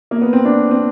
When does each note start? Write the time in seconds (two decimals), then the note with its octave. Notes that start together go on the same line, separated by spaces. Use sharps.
0.11 A#3
0.21 B3
0.33 C4
0.45 D4
0.71 C4